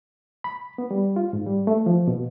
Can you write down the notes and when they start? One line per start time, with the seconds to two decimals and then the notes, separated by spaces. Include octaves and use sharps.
0.44 B5
0.78 B3
0.91 G3
1.16 F4
1.33 G#2
1.46 G3
1.67 A3
1.86 F3
2.08 B2